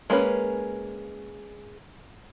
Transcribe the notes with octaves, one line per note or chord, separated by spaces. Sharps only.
G#3 A#3 C#4 B4